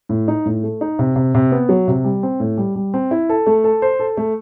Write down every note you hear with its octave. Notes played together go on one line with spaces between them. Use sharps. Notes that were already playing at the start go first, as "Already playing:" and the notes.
A2
D#4
A2
A3
D#4
C3
C3
C3
B3
F#3
C3
G3
C4
A2
G3
G3
C4
E4
A4
A3
A4
C5
A4
A3